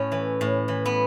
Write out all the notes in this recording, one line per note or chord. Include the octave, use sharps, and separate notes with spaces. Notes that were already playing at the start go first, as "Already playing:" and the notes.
Already playing: A2 C#4
E3
A2
E3
B3